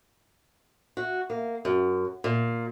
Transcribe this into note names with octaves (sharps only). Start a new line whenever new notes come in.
F#4
A#3
F#2
A#2